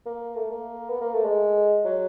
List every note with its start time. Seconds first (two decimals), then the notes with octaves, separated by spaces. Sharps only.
0.06 A#3
0.35 A3
0.51 A#3
0.89 B3
1.01 A#3
1.13 A3
1.25 G#3
1.85 F#3